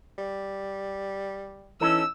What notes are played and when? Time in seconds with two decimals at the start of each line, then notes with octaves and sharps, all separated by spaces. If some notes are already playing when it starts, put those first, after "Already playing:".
0.18 G3
1.81 E3 C#4 D#4 A4 E6